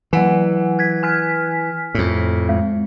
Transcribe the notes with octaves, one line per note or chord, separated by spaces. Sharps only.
E3 F#3 F#5 G#5
F#6 G#6 B6
G#5 F6 B6
F2 A2
G#3